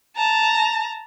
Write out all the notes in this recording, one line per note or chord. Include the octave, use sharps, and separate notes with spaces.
A5 A#5